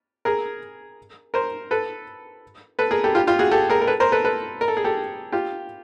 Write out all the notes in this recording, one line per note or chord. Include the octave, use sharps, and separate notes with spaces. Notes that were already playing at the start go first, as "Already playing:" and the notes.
G#4 A#4
A#4 C5
A4 B4
A4 B4
G#4 A#4
G4 A4
F4 G4
F4 G4
F#4 G#4
G4 A4
G#4 A#4
A#4
A4 B4
A#4 C5
A4 B4
A4 B4
A#4
A4
G#4
G4 A4
F4 G4